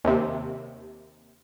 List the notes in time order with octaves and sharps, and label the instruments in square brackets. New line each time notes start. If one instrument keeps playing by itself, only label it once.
[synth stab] D#2 C3